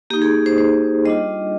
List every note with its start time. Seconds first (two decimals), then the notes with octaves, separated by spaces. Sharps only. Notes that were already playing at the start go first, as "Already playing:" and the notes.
0.10 A#3 D#4 G4
0.22 G#4
0.46 C5
0.58 C5
1.05 G3 D4 F4 D#5